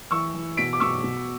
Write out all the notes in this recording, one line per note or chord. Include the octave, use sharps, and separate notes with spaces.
E3 C#6 E6
E3
B2 B6 D7
D6
B2 C#6 E6
B2